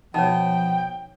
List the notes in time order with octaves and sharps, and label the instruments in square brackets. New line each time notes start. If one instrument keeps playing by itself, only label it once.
[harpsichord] B2 [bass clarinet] F3 [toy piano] D#4 C#5 [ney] G5